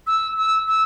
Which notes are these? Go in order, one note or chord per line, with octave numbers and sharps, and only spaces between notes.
E6
E6
E6